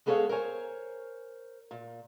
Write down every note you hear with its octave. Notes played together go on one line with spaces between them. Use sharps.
G#3 B3 G#4 A4 C#5 F5
A#4 C5 C#5 G#5
A#2